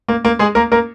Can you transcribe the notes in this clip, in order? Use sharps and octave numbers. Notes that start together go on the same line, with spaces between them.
A#3
A#3
G#3 G#4
A#3 A#4
A#3 A#4